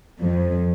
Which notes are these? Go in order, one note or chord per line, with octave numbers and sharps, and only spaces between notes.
F2